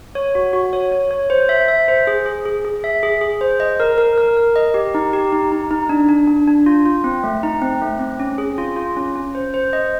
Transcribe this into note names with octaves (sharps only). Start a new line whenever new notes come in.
C#5
F#4
F#4
C#5
C#5
C#5
C5
E5
E5
C5
G#4
G#4
G#4
G#4
E5
G#4
G#4
C5
D#5
A#4
A#4
A#4
A#4
D#5
G4
D#4
G4
D#4
D#4
D#4
D4
D4
D4
D4
F4
F4
C4
A3
D#4
C4
A3
C4
C#4
G#4
F4
F4
C#4
C#4
C5
C5
D#5